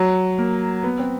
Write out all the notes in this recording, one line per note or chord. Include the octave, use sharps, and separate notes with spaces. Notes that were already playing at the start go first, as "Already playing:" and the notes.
Already playing: F#3
A#3
B3
C4